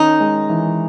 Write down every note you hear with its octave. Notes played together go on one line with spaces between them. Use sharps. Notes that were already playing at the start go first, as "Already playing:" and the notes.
Already playing: D#3 C#4 D#4
G#3
E3